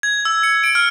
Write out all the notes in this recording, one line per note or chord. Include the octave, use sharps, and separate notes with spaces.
G#6
E6
C#7
D7
F6